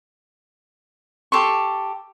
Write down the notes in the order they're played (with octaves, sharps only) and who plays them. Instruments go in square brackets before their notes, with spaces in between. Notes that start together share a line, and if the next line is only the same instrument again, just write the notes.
[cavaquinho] G4 A4 C6 C#6